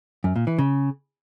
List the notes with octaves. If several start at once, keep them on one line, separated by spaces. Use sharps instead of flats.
F#2
A#2
E3
C#3